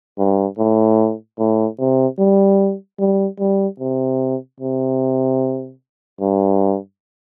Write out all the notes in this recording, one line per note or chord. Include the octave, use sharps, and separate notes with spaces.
G2
A2
A2
C3
G3
G3
G3
C3
C3
G2